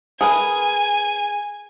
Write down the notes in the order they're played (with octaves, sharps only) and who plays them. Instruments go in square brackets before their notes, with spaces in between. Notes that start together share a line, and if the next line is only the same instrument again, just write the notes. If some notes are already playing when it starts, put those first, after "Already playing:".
[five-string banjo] G#4 A#4 B4 [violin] G#5